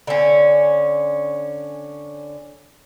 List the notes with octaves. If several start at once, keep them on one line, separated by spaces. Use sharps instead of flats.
D3 C#4